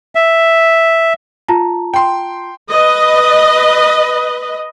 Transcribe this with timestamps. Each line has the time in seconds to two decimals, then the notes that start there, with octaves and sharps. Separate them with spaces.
0.15 E5
1.49 F4 A5 A#5
1.94 G5 C6
2.70 B4 D#5